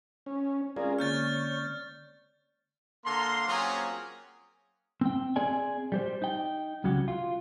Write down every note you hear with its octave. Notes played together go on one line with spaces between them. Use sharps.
C#4
G#3 C4 C#4 F4 G#4 A#4 D5
D3 A#3 C#5 F6 G6 A6
D3 A#3 A#5 C6
F#3 A#3 C4 C#4 F4 G#4
C4 G5
C4 G#4 D5 G#5
G3 G4 C5
D#4 G5
C2 C#3 F#3 F#4 G4
F4